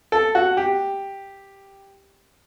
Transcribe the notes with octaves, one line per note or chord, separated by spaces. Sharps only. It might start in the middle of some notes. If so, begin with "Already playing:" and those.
A4
F#4
G4